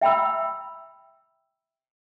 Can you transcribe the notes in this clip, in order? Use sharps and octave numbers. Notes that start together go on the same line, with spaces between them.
E5 G5 A#5 B5 E6